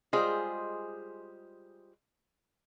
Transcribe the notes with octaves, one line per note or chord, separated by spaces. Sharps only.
G3 G#3 F4 G#4 C5 D#5